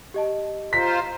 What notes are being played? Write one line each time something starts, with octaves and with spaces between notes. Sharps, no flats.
G4 D#5 A5
F4 C5 A#5 B6